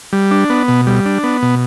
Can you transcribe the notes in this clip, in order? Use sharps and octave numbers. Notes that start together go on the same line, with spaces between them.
G3
D4
B3
B2
G3
D4
B3
B2